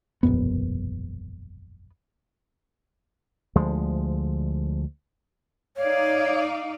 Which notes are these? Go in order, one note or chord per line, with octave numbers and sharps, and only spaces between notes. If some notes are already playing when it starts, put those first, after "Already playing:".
E1 A#1 F#2 B3
D2 F3 G#3
D#4 C#5 D5 F5